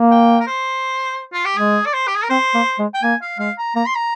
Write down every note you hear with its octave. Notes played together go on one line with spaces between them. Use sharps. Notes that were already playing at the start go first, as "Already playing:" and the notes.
Already playing: A#3
G5
A#4
C5
F4
G4
G#3 G#4
D5
C5
G4
G#4
A#4
C4 C5
A#3
G#3
G5
A#3 G#5
F5
G#3 F5
A#5
A#3 A#5
C6
A#5